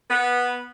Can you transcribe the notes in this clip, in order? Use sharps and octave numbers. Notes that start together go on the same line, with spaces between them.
B3